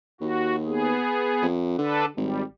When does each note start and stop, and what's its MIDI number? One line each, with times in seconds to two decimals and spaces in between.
0.21 0.95 39
0.21 0.56 66
0.67 1.46 59
0.67 1.46 68
1.42 1.74 41
1.78 2.06 50
1.78 2.05 62
1.78 2.05 69
1.78 2.05 71
2.16 2.43 32
2.16 2.43 55